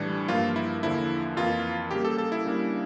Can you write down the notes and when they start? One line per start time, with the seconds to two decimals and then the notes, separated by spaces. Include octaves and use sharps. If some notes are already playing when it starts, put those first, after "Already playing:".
Already playing: A2 E3 G3 D4
0.28 G2 F3 A#3 F4
0.56 E4
0.83 E2 D3 F3 A#3 E4
1.37 F2 E3 A#3 F4
1.91 C#3 G3 A#3 G4
2.05 A4
2.18 A4
2.32 E4
2.45 C#3 G3 A#3 D4